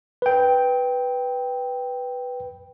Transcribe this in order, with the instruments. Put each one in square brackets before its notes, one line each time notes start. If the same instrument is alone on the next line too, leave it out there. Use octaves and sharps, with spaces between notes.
[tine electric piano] B4 G5